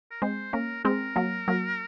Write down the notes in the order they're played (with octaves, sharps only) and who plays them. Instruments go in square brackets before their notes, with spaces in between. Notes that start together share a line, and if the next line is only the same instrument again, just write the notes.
[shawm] A#4
[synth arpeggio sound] G#3 C4 [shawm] C5
[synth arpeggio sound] A#3 C#4 [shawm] A#4
[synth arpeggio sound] G#3 C4 [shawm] A#4
[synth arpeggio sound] F#3 A#3
F#3 A#3